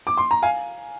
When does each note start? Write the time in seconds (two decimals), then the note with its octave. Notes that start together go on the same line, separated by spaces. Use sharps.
0.07 D6
0.17 C6
0.31 A#5
0.42 F5 G#5